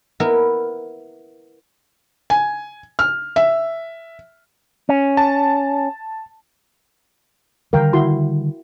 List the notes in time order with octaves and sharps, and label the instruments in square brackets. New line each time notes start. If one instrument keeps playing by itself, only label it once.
[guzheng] B3 E4 A#4
[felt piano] G#5
F6
E5
[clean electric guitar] C#4
[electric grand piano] A5
[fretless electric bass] D3 D#3 G3 [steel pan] A#4 F5 G5
[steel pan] E4 F#4 C6